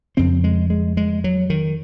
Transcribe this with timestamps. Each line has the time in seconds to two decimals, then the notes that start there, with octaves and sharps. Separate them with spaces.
0.17 F2 C#3 C4
0.44 G#3
0.70 G#3
0.97 G#3
1.24 F#3
1.50 D#3